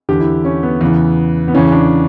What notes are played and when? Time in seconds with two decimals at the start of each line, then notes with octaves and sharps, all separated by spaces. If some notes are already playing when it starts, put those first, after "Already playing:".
0.09 E2 D3 G4
0.20 E4
0.45 C#4
0.63 B3
0.81 E2 C#3 E3
1.48 B3
1.54 E2 C#3 E3 C#4
1.72 D4